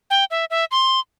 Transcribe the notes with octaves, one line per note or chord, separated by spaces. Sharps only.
G5
E5
E5
C6